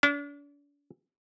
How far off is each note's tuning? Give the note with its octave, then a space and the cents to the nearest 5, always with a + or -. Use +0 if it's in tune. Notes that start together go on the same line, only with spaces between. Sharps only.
D4 -40